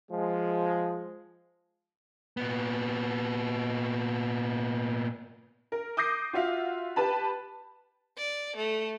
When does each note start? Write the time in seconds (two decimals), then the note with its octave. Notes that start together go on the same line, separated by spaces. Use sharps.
0.12 F3 G#3
2.37 A#2 B3
5.72 A#4
5.97 D6 D#6 G6 A#6 C7
6.33 F4 F#4 E5 F5
6.96 G4 B4 A5 B5
8.18 D5
8.57 A3